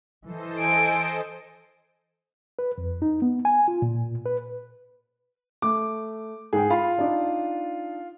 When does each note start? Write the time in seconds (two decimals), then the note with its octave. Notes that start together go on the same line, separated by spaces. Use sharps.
0.25 E3 A4 C5 D#5
0.59 G#5 D7
2.59 B4
2.78 F2
3.02 D#4
3.22 B3
3.45 G#5
3.68 F4
3.82 A#2
4.26 B4
5.62 A3 D6
6.53 G#2 G#4 G5
6.70 F4 B5
6.98 D4 D#4 D5